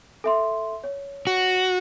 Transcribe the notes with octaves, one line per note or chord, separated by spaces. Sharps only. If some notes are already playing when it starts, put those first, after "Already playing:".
A4 E5 C6
C#5
F#4